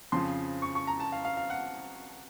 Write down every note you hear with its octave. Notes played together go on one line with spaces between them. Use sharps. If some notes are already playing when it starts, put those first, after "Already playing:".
F2 C#3 F3 C6
C#6
C#6
A#5
A5
F5
F5
F5
F#5